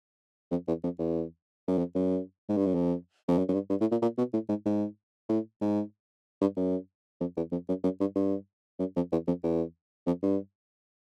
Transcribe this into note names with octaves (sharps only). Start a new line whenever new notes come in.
F2
E2
F2
E2
F#2
F2
F#2
G#2
G2
F#2
F2
F2
F#2
F#2
G2
G2
A2
A#2
A#2
B2
A2
G#2
G#2
A2
G#2
G2
F#2
F2
E2
F2
F#2
F#2
G2
G2
F#2
F2
E2
F2
E2
F2
G2